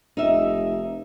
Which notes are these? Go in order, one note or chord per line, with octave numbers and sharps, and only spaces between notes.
F1 D#4 E5